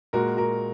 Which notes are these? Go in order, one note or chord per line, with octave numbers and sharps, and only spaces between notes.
A#2 G#3 F#4 A#4
F#4 A#4